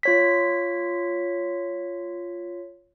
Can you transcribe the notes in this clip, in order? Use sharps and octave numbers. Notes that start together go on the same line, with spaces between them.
F4 C#5 B6